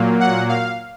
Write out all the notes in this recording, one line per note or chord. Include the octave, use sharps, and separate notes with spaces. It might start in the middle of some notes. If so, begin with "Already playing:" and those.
Already playing: A#2 F#3 A#3
F#5
F5